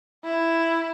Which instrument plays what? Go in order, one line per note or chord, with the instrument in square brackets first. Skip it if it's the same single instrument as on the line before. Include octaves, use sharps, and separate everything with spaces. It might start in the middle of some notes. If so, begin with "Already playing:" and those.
[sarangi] E4